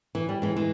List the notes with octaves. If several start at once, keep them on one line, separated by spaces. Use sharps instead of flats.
E3
G3
E3 G#3
E3 G#3